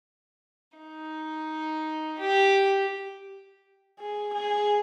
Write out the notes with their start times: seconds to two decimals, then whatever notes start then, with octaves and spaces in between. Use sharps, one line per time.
0.78 D#4
2.19 G4
4.00 G#4
4.34 G#4